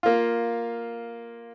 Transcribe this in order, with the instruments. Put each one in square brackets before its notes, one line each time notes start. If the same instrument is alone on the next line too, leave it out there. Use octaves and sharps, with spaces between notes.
[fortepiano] A#3 F4